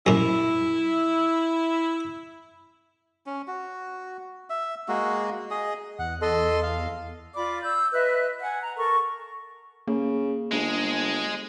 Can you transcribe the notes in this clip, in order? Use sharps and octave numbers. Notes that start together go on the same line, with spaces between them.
F#2 A#2 E4
C#4
F#4
E5
G#3 A#3 F#4
G#4 D#5
E2 F#5
A4 D#5 C6
F5
F4 D5 B5 D6
E6 G6
B4 D#5 E5 F#6
F#5 G#5
A#5
A4 A#4 C#6
C#3 A#3
G1 G#3